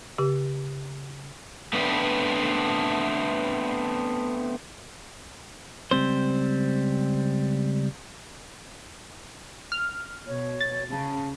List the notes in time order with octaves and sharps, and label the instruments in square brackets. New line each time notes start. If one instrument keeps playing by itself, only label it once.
[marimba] C#3 G4
[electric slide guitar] A3 B3 C4 D4 B4
[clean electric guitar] C#2 G3 C4 C5
[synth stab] F6
[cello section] B2 [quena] C#5
[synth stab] A6
[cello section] C#3 [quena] A5